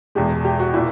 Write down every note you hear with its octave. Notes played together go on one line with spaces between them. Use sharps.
E2 B2 G#3 G4
G4
F#4
A#2 E4